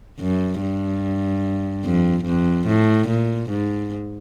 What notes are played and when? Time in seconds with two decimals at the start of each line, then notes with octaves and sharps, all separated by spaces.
0.20 F#2
0.61 G2
1.85 F2
2.26 F2
2.68 A2
3.09 A#2
3.50 G#2